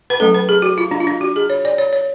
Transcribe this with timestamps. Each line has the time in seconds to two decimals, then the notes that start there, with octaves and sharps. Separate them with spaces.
0.10 B4
0.20 F#3 A3 C#4 A4
0.34 B4
0.49 G#4
0.62 F#4
0.78 F4
0.91 D4
1.00 F4
1.07 D4
1.21 F#4
1.36 G#4
1.50 C#5
1.65 D5
1.78 C#5
1.93 C#5